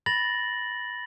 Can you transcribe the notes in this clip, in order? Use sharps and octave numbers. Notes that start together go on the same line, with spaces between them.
B5 A6 A#6 F#7